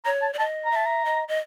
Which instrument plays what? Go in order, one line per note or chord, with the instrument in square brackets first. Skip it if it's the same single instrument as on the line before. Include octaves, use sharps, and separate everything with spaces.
[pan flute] C#5 [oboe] A#5
[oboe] A5
[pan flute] D5
[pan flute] D#5 [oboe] A5
[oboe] A#5
[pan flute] E5 [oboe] A5
[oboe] A#5
[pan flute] D#5
D#5